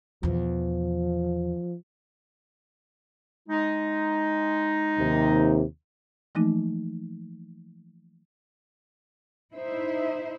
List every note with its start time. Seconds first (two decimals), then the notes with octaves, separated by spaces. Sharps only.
0.23 E2 B2 F3
3.49 G#3 D#4
4.98 D#2 C3
6.35 E3 F3 A3 A#3 D#4
9.54 D#4 E4 C5 E5